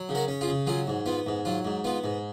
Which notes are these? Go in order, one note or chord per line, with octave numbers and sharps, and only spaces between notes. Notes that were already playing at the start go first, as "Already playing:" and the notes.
Already playing: F#3
C#3
F#4 A#4
C#4
F4 G#4
C#3
F#3 F4 G#4
G#2
B3 F4
G#2
F#3 F4
G#2
B3 F4
G#2